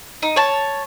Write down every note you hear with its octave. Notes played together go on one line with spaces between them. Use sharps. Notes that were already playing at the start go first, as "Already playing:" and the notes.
D#4
C#5 A5